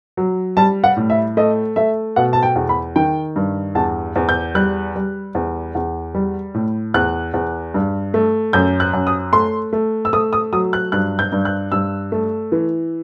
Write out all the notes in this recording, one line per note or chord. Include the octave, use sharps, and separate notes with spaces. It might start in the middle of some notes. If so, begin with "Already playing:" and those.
F#3
G3 A5
F#5
A2
E5
A3 D#5
A3 E5
B2 F#5
A5
G5
E2
B5
D#3 G5
G2
E2 A5
E2
G6
G3 F#6
G3
E2
E2
G3
A2
E2 F#6
E2
G2
A3
F#2 G6
F#6
F#2
D#6
A3 C6
A3
E6
A3 D#6
D#6
F#3 D#6
F#6
G2 F#6
G6
G2
F#6
G2 E6
A3
E3